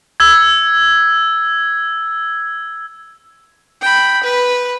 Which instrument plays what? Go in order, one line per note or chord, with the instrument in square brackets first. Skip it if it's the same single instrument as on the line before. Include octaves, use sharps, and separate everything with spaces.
[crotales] E6 G#6
[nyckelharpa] G5 B5
B4